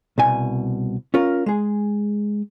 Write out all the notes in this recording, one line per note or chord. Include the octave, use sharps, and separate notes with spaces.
C2 B2 G#5
C#4 F4 A#4
G#3 G#4